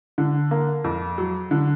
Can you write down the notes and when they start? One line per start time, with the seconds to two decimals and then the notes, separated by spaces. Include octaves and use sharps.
0.18 D3
0.51 A#3
0.84 F2
1.18 F#3
1.51 D3